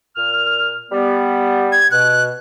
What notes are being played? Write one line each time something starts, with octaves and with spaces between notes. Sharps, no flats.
A#2 F6
G3 B3
G#6
B2 F#6